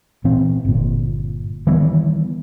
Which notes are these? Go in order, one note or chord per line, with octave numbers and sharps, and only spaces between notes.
A#2 E3 C4
G1 A#2
D#3 E3 G3 B3